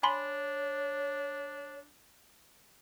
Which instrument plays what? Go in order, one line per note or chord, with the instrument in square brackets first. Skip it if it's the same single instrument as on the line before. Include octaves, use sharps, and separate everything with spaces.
[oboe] D4 [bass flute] C#5 [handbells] G#5 B5 C6